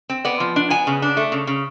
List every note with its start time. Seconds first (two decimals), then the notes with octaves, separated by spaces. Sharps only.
0.10 C4
0.25 B3 D5
0.40 F3
0.56 D4
0.70 B3 G#5
0.87 C#3
1.02 D4
1.17 A3
1.32 C#3
1.47 C#3